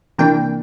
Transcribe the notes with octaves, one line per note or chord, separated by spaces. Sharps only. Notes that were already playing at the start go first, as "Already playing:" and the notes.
C3 E3 A#3 D4 G5